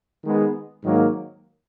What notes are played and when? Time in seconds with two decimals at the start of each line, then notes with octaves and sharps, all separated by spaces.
0.23 D#3 G#3 B3
0.83 G#2 D#3 F#3 A#3